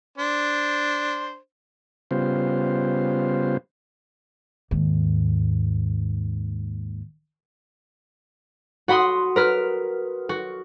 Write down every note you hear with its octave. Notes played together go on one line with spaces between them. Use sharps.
D4 C5
C#3 G3 B3 F4 C5
D#2 G#2
F#4 F#5 B5 C6 D#6
A#4 B4 F6
F#4